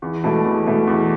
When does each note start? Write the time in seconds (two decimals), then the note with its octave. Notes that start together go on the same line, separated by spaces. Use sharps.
0.02 E2
0.24 B2 A3
0.44 E2
0.67 B2 A3
0.87 E2